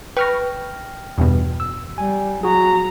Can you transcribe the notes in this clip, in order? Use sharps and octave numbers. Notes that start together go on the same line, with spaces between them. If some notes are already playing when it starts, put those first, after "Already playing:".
B4 G5 C#6 F6 A#6
E2 G2 B2
E6
G3 G#5
F#3 F#4 G#4 A#5